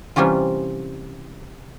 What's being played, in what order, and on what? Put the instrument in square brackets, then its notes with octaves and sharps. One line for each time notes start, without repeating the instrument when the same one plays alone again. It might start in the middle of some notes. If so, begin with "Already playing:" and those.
[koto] C3 E3 G3 C#4 F4